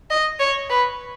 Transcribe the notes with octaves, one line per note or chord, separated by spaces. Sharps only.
D#5
C#5
B4